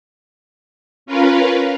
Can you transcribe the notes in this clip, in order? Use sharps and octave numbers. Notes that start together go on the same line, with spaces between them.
C#4 F4 A#4 B4 F5